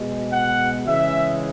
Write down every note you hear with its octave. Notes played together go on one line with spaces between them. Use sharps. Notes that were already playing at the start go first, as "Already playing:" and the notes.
Already playing: B2 G#3
F#5
C#3 E3 G#3 E5